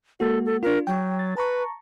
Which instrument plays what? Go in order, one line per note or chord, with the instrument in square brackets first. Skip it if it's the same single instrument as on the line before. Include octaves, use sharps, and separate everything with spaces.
[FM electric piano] G#3 A#3 F#4 [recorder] A4
[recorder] A4
[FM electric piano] D4 F4 [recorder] A#4
[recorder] F#3 [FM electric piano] G5
[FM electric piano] A6
[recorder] B4 [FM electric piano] A5 A#5 C#6